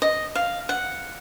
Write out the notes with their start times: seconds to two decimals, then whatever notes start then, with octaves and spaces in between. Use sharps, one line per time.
0.02 D#5
0.35 F5
0.69 F#5